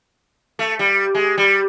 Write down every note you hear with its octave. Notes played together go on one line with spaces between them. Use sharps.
A3
G3
G#3
G3